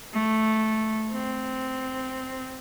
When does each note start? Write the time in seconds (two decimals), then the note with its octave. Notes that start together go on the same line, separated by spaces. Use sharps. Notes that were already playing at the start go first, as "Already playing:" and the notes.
0.14 A3
1.13 C4